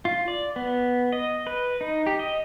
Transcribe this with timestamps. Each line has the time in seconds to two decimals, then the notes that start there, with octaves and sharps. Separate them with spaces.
0.05 F4
0.28 D5
0.56 B3
1.13 D#5
1.47 B4
1.81 D#4
2.07 G4
2.19 D#5